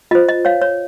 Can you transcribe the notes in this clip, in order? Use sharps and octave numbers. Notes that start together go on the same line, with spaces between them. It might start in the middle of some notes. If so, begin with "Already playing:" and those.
F4 C5 D#5
D#5
C#5 F5
C#5